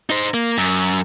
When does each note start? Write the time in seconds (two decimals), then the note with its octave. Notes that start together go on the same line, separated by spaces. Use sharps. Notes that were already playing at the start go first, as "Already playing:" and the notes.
0.10 D#4 C5
0.34 A#3
0.58 F#2